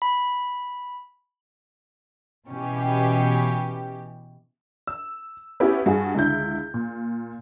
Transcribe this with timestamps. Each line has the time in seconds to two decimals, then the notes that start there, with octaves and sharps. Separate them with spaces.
0.02 B5
2.47 B2 E3 C#4 G4
4.87 E6
5.60 B3 C#4 E4 F#4 G4
5.86 G2 F#4 G#4
6.15 C#2 D3 E4 G6
6.74 A#2